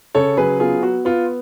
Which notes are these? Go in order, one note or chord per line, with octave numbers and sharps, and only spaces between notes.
C#3 A4 C#5
F#3 G#4 B4
B3 F4 G#4
B3 F#4
B3 F4